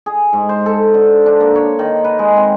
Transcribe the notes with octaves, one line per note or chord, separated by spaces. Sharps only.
G#4
G#2
C5
A4
D3
D4
A#3
C#5
D#3
B4
G#3
C4